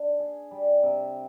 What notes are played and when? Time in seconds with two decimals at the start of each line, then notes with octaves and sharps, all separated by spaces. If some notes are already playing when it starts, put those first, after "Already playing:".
Already playing: D4
0.20 G#4
0.51 G3
0.83 C3